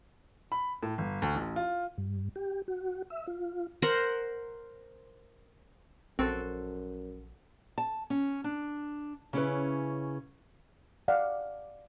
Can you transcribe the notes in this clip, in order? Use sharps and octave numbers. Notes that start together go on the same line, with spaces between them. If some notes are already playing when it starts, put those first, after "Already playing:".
B5
A2
G1
D2
A1
F4
G2
G4
F#4
E5
F4
A#4 C5 F#5
A#1 F#2 C4 F#4 A4 C5
A5
C#4
D4
C#3 C#4 E4 B4
D5 F5 F#5